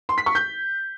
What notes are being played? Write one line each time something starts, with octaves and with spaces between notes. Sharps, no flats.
C6
B6
C#6
G6